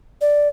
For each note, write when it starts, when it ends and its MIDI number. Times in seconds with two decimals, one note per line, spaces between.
0.21 0.48 74